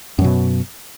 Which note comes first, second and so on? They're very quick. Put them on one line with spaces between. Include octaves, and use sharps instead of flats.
F#2 F#3 B2